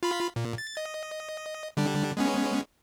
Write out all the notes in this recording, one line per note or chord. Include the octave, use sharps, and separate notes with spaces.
F4 B5
A#2
A6
D#5
D3 G3 D4
G#3 B3 C#4